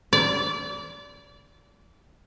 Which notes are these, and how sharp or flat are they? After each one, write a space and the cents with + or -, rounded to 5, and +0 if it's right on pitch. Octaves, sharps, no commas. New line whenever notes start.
D5 -25